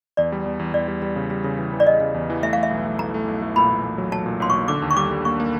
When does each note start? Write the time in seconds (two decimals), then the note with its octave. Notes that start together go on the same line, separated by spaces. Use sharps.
0.17 E2 D5
0.32 G3
0.45 E2
0.59 E2
0.74 E2 D5
0.88 G3
1.02 G3
1.16 C#3
1.30 G3
1.44 C#3
1.58 E3
1.73 E3
1.80 D5
1.87 E3 D#5
2.00 C#3
2.14 E2
2.30 E3
2.43 A3 E5
2.53 A3 F5
2.63 E5
2.71 B1
2.85 A3
2.99 A3 A#5
3.14 A3
3.28 B1
3.42 A3
3.56 A#2 B5
3.70 A#2
3.84 A3
3.98 F#3
4.12 F#3 A5
4.26 A#2
4.40 B1 C6
4.50 A#2 C#6
4.68 D3 D6
4.82 D#2
4.91 C#6
4.97 G3 D6
5.11 G3
5.25 A#3 C#6
5.40 A#3